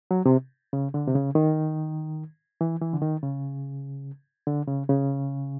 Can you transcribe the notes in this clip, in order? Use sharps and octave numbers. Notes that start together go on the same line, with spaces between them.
F#3
C3
C#3
D3
C3
C#3
D#3
E3
E3
D3
D#3
C#3
D3
C#3
C#3